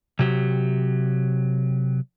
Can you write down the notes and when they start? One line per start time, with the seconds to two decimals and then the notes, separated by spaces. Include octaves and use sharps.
0.19 C3 F#3 G4